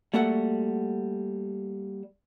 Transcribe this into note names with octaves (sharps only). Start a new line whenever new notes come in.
G3 A3 A#3 F#4 A4 F#5